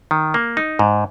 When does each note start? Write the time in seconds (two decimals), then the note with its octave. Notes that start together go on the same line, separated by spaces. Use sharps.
0.11 D#3
0.34 A#3
0.57 D#4
0.79 G#2